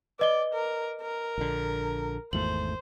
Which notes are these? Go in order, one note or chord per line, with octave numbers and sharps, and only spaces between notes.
B4 D5 D#5 G7
A#4
A#4
A#1 D3
G#1 E2 A3 C5 F#7